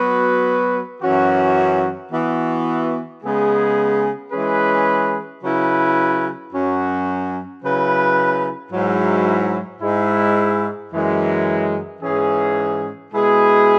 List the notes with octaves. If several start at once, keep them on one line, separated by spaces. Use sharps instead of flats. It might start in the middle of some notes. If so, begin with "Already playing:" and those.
Already playing: F#3 B3 F#4 B4
F#2 E3 C#4 F#4
E3 B3 F#4
C#3 G#3 B3 G#4
E3 G#3 C#4 G#4 B4
C#3 F#3 E4 B4
F#2 F#3 C#4 F#4
C#3 F#3 E4 B4
G#2 F#3 E4
G#2 G#3 E4
F#2 E3 G#3
G#2 E3 C#4 G#4
B2 G#3 E4 G#4 B4